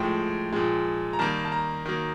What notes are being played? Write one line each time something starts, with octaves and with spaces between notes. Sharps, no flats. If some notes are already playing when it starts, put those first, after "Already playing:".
Already playing: A2 F3 G#3 G5
A#2 F3 G#3
A#5
D#3 G3 A#3 A5
A5
A#5
D#3 F#3 A#3